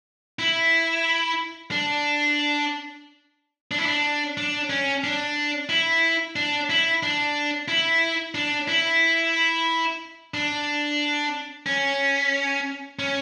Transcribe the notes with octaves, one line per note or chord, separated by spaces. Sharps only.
E4
D4
D4
E4
D4
D4
C#4
D4
E4
D4
E4
D4
E4
D4
E4
D4
C#4
C#4